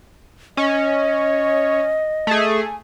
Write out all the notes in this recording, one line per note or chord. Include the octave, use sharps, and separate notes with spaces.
C#4 D#5
A3 G#4
G#5